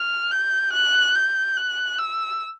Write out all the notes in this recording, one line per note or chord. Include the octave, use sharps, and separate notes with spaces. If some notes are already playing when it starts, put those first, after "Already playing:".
Already playing: F6
G6
F#6
G6
F#6
E6